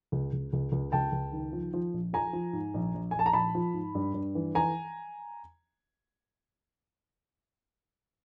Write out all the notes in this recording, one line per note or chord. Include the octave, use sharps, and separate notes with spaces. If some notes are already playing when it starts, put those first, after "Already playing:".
C#2
C#2
C#2
C#2
C#2 G5 A5
C#2
D#3
F3
F3
A#1
F3 G#5 A#5
F3
G#2
A#1
A#1
A#1 G#5
A5
A#5
A#1 A5 B5
F3
G#2
G2
G2
E3
E3 G#5 A#5